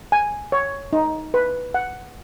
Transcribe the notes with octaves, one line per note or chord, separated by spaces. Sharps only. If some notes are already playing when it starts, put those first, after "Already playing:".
G#5
C#5
D#4
B4
F#5